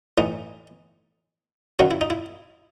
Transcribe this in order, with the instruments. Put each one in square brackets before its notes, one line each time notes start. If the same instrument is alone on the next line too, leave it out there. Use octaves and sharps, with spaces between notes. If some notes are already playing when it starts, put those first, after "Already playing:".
[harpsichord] A2 E3 D#4
F#2 D#3 F#3 F#4
E4
D#4
E4